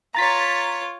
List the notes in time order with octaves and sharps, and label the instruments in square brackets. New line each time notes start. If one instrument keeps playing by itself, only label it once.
[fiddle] F4 C#5 [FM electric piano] A#5 A6 B6